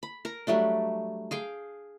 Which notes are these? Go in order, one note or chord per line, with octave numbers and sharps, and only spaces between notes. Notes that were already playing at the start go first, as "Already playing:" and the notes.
B5
A#4 A#5
F#3 G3 A3 D4
G#4 F5 G5